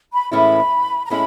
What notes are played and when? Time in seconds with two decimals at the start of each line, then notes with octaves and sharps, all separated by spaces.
0.12 B5
0.31 A2 E3 G#3 C#4 E4 B5
1.05 A#5
1.10 A2 G#3 C#4 E4 B5